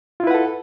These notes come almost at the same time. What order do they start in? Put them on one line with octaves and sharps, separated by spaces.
F4 E4 B4 F#5 A4